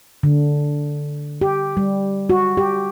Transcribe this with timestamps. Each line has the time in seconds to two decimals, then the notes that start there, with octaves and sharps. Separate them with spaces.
0.23 D3
1.41 G4
1.77 G3
2.30 F#4
2.57 G4